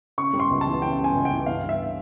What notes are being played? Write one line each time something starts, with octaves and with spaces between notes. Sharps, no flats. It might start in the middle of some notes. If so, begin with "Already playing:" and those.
C#3 C#6
G3
C6
C#2
A5
E3
C#3 G5
G3
G#5
C#2
G5
E3
G2 F5
G3
E5